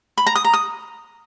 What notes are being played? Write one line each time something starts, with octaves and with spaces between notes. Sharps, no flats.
B5
A#5
D#6
A#5
D#6